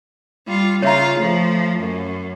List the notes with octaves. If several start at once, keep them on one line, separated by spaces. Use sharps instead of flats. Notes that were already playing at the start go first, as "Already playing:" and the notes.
G3 F4
C#3 F4 C#5 E5 A#5
F3 A3
F#2